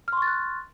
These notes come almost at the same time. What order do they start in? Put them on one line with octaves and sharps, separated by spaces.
F6 C6 C#6 A6 F#6